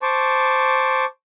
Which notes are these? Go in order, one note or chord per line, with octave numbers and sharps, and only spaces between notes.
C5 A5 C#6 D6